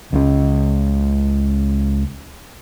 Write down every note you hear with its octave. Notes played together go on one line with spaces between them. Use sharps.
C#2 C#4